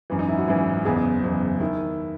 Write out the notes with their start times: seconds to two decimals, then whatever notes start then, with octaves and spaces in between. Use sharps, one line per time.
0.10 G#1 F#2 E3
0.19 D#4
0.29 E4
0.38 F#4
0.48 G#1 F#2 E3 E4
0.85 F#1 E2 C#3 G#4
1.23 F#1 E2 C#3
1.60 D#3 E4